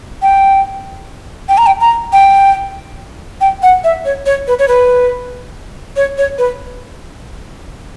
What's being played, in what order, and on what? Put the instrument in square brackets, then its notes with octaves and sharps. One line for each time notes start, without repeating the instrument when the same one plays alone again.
[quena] G5
G5
A#5
G5
A#5
G5
G5
F#5
E5
C#5
C#5
B4
C#5
B4
C#5
C#5
B4